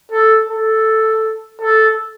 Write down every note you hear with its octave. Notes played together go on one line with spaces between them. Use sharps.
A4
A4
A4